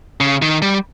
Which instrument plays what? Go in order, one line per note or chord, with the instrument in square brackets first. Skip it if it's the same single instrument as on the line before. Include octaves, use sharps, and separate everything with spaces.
[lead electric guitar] C#3
D#3
G3